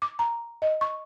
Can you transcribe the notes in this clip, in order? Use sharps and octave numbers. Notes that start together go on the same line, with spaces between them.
D6
A#5
D#5
C#6